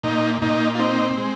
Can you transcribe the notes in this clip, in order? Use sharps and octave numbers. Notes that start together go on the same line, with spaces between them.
A#2 D#4
A#2 D#4
F4
C4 D#4
G#3